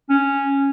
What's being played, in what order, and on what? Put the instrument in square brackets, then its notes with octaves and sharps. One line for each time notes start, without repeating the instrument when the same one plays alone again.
[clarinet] C#4